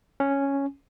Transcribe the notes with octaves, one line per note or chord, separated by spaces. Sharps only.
C#4